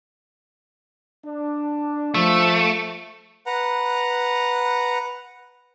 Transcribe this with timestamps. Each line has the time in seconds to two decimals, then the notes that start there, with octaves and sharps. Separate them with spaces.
1.25 D4
2.14 F3 A3
3.46 B4 F#5 A#5